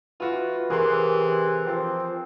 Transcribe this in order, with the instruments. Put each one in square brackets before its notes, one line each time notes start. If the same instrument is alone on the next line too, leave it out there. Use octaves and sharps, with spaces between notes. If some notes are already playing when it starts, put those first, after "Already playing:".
[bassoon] E3 [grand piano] F4 F#4
[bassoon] C3 [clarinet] E3 [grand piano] G#4 C6 [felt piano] A#4
[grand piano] F3 [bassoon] C4